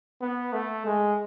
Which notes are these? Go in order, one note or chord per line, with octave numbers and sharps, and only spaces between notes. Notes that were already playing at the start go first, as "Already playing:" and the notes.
B3
A3
G#3